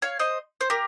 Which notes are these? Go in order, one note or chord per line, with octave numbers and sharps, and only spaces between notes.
C#5 F5
C5 D#5
C5
G4 A#4